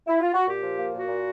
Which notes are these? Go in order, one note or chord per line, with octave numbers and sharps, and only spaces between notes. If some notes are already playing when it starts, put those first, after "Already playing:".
E4
F4
F#4
A#2 G4
F3
A#3
A#2 F#4
A#2